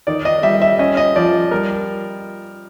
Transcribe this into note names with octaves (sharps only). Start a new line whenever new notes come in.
D#3 D5
D#5
G3 E5
E5
C#4 D#5
D#5
F3 D5
G3 A#4